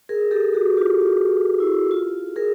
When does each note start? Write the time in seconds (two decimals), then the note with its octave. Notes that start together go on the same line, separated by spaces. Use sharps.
0.09 G#4 A#4
0.31 G4 A4
0.54 F#4 G#4
0.77 F4 G4
1.00 F4
1.60 E4
1.91 F4
2.36 G#4 A#4